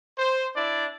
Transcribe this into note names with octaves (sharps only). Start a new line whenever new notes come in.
C5
D4 E4 D5